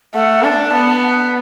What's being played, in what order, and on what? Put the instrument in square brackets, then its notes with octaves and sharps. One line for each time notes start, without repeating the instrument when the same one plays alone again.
[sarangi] A3 [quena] F#5
[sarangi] D4 [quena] A5
[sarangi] B3
[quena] F#5